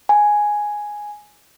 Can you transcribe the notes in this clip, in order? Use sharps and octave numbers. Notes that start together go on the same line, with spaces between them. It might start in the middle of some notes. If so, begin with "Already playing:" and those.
G#5